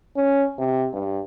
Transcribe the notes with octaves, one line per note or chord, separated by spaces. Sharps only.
C#4
C3
G2